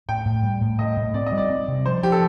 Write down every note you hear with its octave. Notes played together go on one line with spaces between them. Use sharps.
A2 G5
A2
G3
A2
A2 D#5
A2
C4 D5
D#5
G3
D5
C4
C3
F3 C5
F3 G4
A4